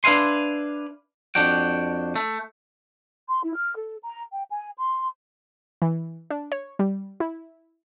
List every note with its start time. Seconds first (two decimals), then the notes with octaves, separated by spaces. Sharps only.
0.04 D4 B4 E5 F5 G#5 C6
1.35 F2 D4 F#4 G5
2.16 A3
3.28 C6
3.43 E4
3.55 F6
3.76 A4
4.03 A#5
4.33 G5
4.50 G#5
4.78 C6
5.82 E3
6.30 D4
6.52 C#5
6.79 G3
7.20 E4